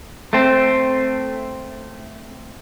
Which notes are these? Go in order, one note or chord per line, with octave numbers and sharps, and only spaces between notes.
A3 C4